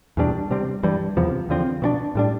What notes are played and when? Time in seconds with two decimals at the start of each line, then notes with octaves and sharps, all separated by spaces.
0.17 E2 B2 G3 D4
0.51 C3 G3 C4
0.83 G2 E3 G3
1.17 E2 C3 F3 B3
1.49 E2 D3 F3 C4
1.82 B2 B3 D4
2.15 A2 G3 D4